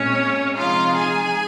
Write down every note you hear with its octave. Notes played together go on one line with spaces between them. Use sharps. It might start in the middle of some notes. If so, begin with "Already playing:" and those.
Already playing: A#2 G#3 C4 C#4 C#5
C3 F3 G#3 D#4 F4 F5
G#4 G#5